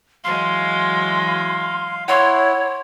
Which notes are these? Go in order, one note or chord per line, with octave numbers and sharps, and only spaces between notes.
E3 F#3 G#3 F5 C6
F5
E4 C#5 F#5 C6 C#6